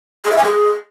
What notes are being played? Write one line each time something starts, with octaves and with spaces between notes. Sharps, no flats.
G#4
E5
G#5
G#4